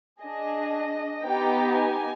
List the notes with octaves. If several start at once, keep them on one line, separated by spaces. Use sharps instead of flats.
D4 G#4 D#5
B3 D#4 G4 G5
G#5